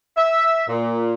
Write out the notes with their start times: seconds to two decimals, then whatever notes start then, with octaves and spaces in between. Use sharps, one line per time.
0.16 E5
0.67 A#2